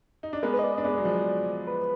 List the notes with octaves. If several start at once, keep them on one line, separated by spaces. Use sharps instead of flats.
D#4
D4
G#3 B3 A#4
B4
D#5
D5
D4 D#5
G#3 B3 D5
F#3
F3 G#3
B4